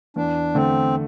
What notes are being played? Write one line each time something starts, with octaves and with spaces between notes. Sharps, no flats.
E2 D4
D3 A3 C4